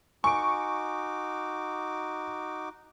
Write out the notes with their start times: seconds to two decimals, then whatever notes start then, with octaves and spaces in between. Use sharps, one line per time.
0.24 D#4 F#4 G#5 C#6 D6 D7